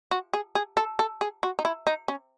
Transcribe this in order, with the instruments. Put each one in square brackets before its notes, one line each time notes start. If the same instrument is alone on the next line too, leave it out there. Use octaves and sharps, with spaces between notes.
[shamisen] F#4
G#4
G#4
A4
A4
G#4
F#4
D#4
E4
D#4
C#4